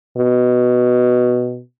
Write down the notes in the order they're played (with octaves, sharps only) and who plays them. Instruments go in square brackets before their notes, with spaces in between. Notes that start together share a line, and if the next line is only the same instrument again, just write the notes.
[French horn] B2